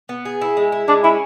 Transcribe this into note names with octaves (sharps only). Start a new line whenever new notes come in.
B3
G#4
E4
G#3
E4
G#3 D4
C#4 E4